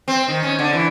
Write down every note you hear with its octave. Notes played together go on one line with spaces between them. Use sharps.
C4
D#3
C#4
D3
E3